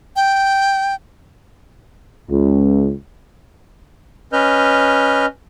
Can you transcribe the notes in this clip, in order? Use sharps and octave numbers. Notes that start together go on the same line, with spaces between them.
G5
C#2
C#4 B4 D#5 F6 G6